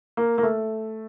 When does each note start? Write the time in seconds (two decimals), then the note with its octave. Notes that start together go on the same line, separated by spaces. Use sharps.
0.17 A#3
0.38 A#3
0.43 A3